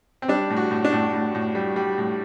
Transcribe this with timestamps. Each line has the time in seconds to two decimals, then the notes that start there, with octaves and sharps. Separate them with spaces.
0.22 C4
0.28 G3 D4
0.50 A2
0.56 F#4
0.71 A2
0.85 D4
0.92 A2
1.14 A2
1.35 A2
1.55 G3
1.76 G3
1.98 A2